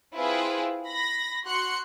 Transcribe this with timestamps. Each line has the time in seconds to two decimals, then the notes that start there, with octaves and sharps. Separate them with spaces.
0.14 C4 E4 F4 G#4 B4
0.86 B5 A#6
1.44 F#4 C6 F#6 C#7